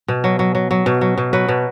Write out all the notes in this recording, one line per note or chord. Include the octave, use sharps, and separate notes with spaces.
B2
F#3
F#3
F#3
F#3
B2
F#3
B2
F#3 B4
B2